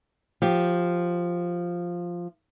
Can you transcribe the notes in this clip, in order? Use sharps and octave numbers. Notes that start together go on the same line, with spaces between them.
F3 G4